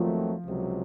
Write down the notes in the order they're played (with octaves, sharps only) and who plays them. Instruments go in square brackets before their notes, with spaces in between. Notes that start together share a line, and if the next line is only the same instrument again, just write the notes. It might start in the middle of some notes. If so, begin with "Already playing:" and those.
Already playing: [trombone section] D#2 D#3 F#3 A3 C4 [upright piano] F3
[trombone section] C#2 C3 F#3